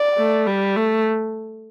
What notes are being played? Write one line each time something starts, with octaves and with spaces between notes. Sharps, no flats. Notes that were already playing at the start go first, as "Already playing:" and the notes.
Already playing: D5
A3
G3
A3